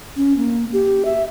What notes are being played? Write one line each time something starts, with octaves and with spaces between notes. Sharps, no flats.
C#4
A#3
G4
E5